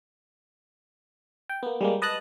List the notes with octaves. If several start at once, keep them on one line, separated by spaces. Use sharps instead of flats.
G5
A#3 B3
G3 G#3 A#3
B4 D#5 A5 D#6 F#6